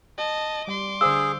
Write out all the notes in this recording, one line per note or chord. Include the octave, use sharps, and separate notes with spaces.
D#5 A5
G3 C6 D6
D3 G#4 C5 F5 E6